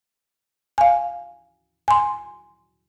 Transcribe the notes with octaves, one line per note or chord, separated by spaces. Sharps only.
F5 G#5
G#5 C6